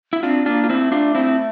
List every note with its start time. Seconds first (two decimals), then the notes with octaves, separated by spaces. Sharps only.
0.13 E4
0.23 C4 D4 F4
0.46 A#3 D4 F4
0.64 F4
0.69 A3 C4 E4
0.92 D4 F4
1.15 C4 E4